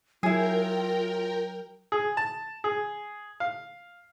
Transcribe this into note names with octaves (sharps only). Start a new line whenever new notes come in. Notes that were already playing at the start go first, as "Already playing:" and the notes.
F#3 E4 F4 G#4 A#4 G5
G#4
A5
G#4
F5